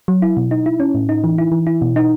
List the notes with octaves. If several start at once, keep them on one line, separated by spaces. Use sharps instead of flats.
F#3
E4
B2
D#4
E4
C#4
A2
D#4
E3
E4
E3
E4
B2
D#4